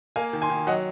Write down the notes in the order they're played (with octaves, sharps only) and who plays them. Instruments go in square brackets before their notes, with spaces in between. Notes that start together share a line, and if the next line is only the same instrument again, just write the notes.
[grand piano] A#3 F5 G#5
D#3
G#5 C6
D#3
F#3 D#5 F#5